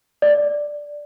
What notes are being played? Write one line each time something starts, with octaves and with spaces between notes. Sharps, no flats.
D5